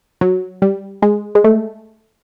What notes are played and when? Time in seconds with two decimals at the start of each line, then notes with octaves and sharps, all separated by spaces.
0.21 F#3
0.62 G3
1.02 G#3
1.35 G#3
1.44 A3